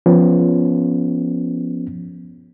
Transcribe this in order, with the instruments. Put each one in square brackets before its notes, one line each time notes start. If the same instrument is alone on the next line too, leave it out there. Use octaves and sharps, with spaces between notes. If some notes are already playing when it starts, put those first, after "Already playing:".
[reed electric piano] F3 B3 C#4